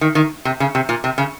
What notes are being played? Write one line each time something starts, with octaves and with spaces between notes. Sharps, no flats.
D#3
D#3
C3
C#3
C3
A#2
C3
C#3